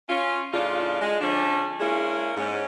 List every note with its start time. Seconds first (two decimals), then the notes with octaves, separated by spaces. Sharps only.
0.09 C#4 F4
0.52 A2 C#3 D4 D#4 F4
1.01 G#3
1.20 D3 F3 C#4 D4
1.80 G#3 A#3 C#4 D4 E4 G#4
2.37 G#2 C#4